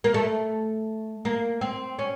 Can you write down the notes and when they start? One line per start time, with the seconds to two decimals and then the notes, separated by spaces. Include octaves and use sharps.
0.04 A#3
0.14 A3
1.25 A#3
1.61 C4
1.99 C#4